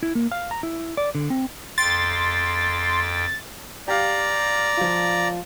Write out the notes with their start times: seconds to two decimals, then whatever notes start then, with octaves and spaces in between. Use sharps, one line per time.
0.03 E4
0.15 A#3
0.32 F5
0.51 A#5
0.63 E4
0.97 D5
1.15 D3
1.30 C4
1.78 F2 G5 C6 A6
3.88 G4 D5 F5 A#5
4.77 F3 F4